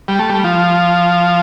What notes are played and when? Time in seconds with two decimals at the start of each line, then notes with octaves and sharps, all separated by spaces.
0.08 G3
0.19 A3
0.30 G3
0.44 F3